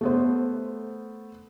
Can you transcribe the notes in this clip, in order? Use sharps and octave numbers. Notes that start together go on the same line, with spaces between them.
A3 B3 C5